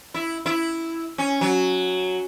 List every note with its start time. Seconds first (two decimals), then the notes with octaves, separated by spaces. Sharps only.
0.14 E4
0.46 E4
1.18 C#4
1.41 F#3